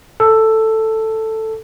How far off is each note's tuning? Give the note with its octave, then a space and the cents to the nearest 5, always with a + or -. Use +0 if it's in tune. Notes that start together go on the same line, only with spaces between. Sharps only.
A4 +5